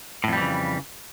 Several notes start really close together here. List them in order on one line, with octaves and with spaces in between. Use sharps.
A2 F2 G3 E3 C#3